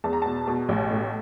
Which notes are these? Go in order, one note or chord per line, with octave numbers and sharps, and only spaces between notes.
E2 A5
A#5
B2 A5
B2
A1
A2